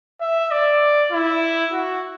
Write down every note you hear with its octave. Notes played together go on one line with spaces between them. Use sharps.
E5
D5
E4
F#4